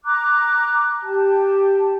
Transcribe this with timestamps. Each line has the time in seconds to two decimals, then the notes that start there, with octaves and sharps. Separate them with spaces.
0.04 A#5 D6 F#6
1.03 G4 A5